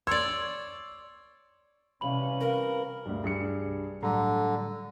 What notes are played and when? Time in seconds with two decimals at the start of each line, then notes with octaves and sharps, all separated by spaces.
0.07 C#5 D5 C6 E6
2.01 C3 E3 G3 C#4 F5 B5 F#7
2.40 A#4 B4 F5
3.06 D2 G2
3.24 G2 G#4 C#7
3.66 C2
4.03 A2 D3 F#3 G3 A#5